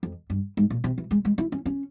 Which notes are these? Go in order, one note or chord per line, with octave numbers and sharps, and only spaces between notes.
F2
G2
G#2
A#2
C3
E3
G#3
G#3
E4
C#4
C#4